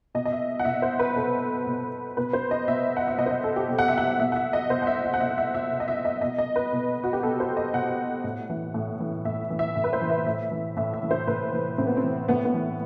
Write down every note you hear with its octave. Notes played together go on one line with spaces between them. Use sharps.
B2 D#5
D#5
E5
F#5
B2 E5
C5
B4
B2 A4
B2
B2 B4
C5
D#5
B2 E5
F#5
E5
B2 D#5
C5
D#5
A4
G4
B2
F#5
E5
F#5
B2 E5
F#5
E5
D#5
B2 C5
F#5
E5
E5
F#5
B2 E5
E5
E5
B2
D#5
E5
D#5
B2 D#5
D#5
B4
B2
F#4
G4
B2 A4
C5
D#5
B2 F#5
A2
E3
A2
E3
A2 E5
E3
E5
A2
B4
C5
E3
E5
A2 E5
E3
A2 E5
E5
E3
C5
A2 B4
E3
A2 C4
B3
C4
E3
A2 B3
B3
E3